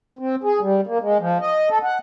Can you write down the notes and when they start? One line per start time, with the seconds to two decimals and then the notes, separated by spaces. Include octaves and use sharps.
0.19 C4
0.44 G#4
0.60 G3
0.87 A#3
1.01 G#3
1.19 F3
1.41 D#5
1.70 A4
1.83 F#5